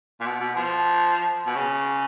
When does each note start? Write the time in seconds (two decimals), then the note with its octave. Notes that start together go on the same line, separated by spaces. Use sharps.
0.20 A#2
0.26 B2
0.40 B2
0.55 F3
1.46 B2
1.56 C#3